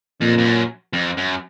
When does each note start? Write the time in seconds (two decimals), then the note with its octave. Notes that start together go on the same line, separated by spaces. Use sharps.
0.21 F2 A#2
0.38 F2
0.45 F#2
0.93 F2
1.17 F#2